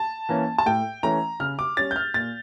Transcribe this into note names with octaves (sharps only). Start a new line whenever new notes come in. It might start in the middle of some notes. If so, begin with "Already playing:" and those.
Already playing: A5
E3 A#3 C#4
A5
A2 G5
E3 A3 C#4 A#5
C#3 F6
D6
G3 C#4 A6
G6
F6
A#2 A6